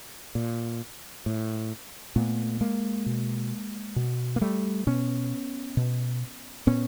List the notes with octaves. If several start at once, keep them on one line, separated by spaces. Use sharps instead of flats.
A#2
A2
A#2 A3 B3
G#3 A#3
B2
B2
A#3
G3 A3
B2 B3 C#4
B2
A#2 B3 C#4